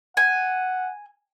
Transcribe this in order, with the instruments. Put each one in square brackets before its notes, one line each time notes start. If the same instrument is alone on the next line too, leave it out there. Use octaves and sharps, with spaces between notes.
[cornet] F#5 [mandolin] G#5